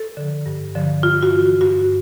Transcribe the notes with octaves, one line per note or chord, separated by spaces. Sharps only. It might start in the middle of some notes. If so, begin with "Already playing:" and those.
Already playing: A4
D3 F3
G2
D3 F3
G2 F4
F#4
E3
G2 F#4